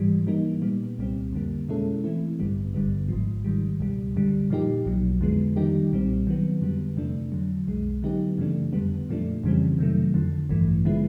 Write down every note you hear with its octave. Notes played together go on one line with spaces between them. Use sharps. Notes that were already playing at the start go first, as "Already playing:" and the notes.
Already playing: G#2 E3 G3
E3 G3 A#3 D#4
A#2 G3 B3
C2 A#2 G3 C4
F2 D3 G3 A#3
B2 G#3 C#4 E4 A4
E3 A3 C4 E4
A1 G2 D3 G3 B3
G#1 G2 D3 G3 B3
G#1 G#2 F3
G#2 D#3 G3
C#2 B2 G3
F#2 D3 G3
A#2 F3 A#3 D#4 G4
B1 B2 F#3
F2 D3 F3 G#3 B3
D#3 G3 A#3 D#4 G4
B1 A#2 G3 C4
D#3 F#3 B3
F2 D3 G3 B3
E2 C3 F3 A3 D4
F2 D3 F#3
B1 B2 G#3
D3 F#3 B3 D#4 G4
F#2 C#3 E3 A3 D4
F2 D3 G3 B3
A#2 F3 A3 D4
F2 C#3 E3 G3 C4
C3 D#3 F#3 A3
F2 D3 F3
A1 G2 E3 A3
D3 F3 G#3 B3 E4